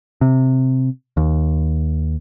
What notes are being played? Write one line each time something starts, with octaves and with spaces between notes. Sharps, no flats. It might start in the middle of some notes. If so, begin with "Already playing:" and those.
C3
D#2